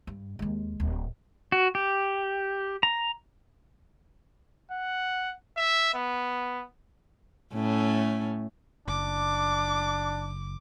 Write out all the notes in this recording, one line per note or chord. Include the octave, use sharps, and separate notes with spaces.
G2
D#2 G#3
D1
F#4
G4
A#5
F#5
E5
B3
A2 A3 C#4
F#1 D4 D6